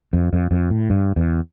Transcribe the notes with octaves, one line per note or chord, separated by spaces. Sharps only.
F2
F2
F2
A2
G2
E2